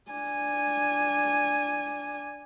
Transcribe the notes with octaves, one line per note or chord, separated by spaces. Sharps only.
D4 G#5